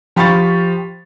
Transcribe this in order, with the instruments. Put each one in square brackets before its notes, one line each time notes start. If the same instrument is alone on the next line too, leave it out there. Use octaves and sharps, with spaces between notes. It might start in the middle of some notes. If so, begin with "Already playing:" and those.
[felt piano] F3 G4 F5 B5 C#6 A6